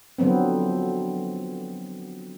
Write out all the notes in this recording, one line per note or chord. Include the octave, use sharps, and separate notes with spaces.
D3 F3 F#3 B3 C4